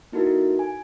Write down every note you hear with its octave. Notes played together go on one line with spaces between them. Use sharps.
A#3 D#4 E4 F#4 A4 A#4
G#5